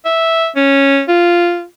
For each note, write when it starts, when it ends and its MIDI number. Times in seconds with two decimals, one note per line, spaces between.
0.05 0.48 76
0.56 1.02 61
1.08 1.65 65